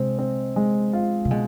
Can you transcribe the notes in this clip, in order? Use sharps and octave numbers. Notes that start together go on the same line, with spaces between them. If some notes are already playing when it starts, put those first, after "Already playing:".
Already playing: C3 G#3 C4
C4
G#3
F4
C3
B2 G#3